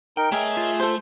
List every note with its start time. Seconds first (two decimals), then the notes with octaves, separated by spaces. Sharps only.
0.17 D#4 A#4 G5
0.32 A3 G#4 A#4 C#5 D#5 E5
0.57 F4
0.80 A4 C5